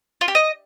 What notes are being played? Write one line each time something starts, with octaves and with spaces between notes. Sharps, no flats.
F4
G4
D#5